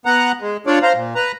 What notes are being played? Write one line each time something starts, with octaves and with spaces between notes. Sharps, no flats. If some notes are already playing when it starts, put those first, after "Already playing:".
B3 F#5 A#5
G#3
D4 F4 C#5 D5
C5 F5 A#5
A#2
B4 A#5